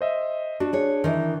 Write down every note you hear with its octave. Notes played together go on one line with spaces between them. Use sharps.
C5 D#5 E5
D4 F#4
G#4 C#5
D#3 E3